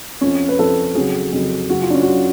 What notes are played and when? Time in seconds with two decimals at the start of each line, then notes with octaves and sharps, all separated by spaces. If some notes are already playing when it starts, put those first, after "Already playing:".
0.21 F2 F3 C#4
0.49 B4
0.59 F2 F3 A4
0.95 F2 C#3 F#3 G#4
1.33 F2 C#3 F#3
1.69 F#2 C#3 F#3 F#4
1.82 F4
1.90 D4
1.94 C#4
2.02 F#4
2.06 F#2 C#3 F#3 F4